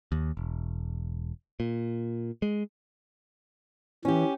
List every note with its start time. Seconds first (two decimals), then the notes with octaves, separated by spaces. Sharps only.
0.12 D#2
0.37 E1
1.60 A#2
2.42 G#3
4.05 E3 C#4 G4